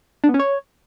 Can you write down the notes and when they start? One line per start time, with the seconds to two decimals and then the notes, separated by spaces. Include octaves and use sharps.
0.24 D4
0.29 B3
0.34 C#4
0.39 C#5